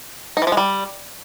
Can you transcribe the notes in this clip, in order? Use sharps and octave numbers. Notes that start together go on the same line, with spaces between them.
D#4
E3
F3
G#3
G3